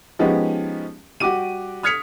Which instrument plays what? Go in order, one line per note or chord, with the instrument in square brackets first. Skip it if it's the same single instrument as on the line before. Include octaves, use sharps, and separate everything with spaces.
[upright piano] F3 G#3 B3 C#4 D#4 G4
G3 F#4 G4 D6 D#7
D#6 F6 G#6 B6 C#7 F7